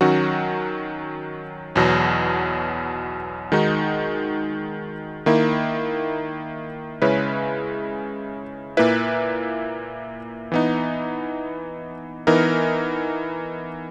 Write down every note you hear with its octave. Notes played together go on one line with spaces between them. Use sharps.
D#3 F#3 C#4 F#4
E2 B2 F#3
D#3 G#3 D#4 F#4
D#3 A#3 E4
C#3 G#3 C#4 E4 B4
A#2 A#3 E4 B4
E3 B3 D#4
E3 B3 D#4 A#4